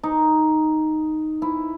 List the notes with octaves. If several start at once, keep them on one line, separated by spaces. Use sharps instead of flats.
D#4
E4